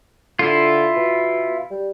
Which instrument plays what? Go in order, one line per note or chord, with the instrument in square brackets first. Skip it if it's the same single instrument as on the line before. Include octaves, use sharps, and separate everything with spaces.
[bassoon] D3 [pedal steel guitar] E4 F4
[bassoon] B2
G3